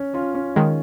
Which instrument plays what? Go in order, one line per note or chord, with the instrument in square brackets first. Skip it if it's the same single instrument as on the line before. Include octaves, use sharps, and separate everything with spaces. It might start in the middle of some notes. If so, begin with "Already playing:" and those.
Already playing: [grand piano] C#4
C#4 F4
C#4
[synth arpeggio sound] D#3 G#3